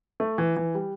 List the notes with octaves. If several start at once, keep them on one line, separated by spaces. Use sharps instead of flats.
A3
E3
E3
G3